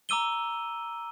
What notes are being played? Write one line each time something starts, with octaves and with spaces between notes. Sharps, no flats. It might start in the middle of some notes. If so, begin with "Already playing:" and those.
A#5 D6 E6 D#7 G7